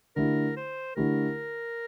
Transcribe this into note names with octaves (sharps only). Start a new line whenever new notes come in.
D3 A3 E4 G4 A#4
C5
D3 A3 E4 G4 A#4